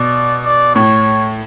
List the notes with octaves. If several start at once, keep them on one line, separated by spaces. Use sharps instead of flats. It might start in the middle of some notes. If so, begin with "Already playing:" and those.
Already playing: B2 D5
D5
A2 C#5